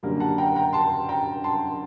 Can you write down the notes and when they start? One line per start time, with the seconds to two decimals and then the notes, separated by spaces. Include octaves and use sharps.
0.03 F#2 D3 G3 A#3
0.20 F#5 A5
0.38 G5 A#5
0.56 G5 A#5
0.73 A5 C6
1.09 G5 A#5
1.44 A5 C6